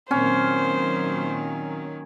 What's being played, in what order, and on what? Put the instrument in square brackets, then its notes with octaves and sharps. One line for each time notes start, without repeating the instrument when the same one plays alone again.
[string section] A#2 D#3 F#3 [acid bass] C4 [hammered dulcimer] C#4 [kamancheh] C5